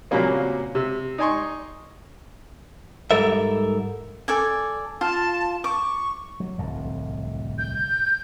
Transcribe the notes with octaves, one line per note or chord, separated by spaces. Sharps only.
A#2 C#3 F#3 G3 A#3 C4
C3
D#4 D5 G#5 C6 C#6
G#2 G3 A4 A#4 E5
A4 D5 G#5
F4 A5
C#6 D6
F#3
D1 C2 F2
G6